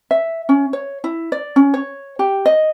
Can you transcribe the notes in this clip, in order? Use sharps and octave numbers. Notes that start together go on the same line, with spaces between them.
E5
C#4
C#5
E4
D5
C#4
C#5
G4
D#5